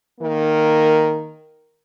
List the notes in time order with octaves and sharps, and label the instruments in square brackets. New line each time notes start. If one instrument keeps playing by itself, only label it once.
[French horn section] D#3 A#3 A#4